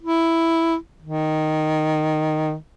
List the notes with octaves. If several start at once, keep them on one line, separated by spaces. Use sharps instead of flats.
E4
D#3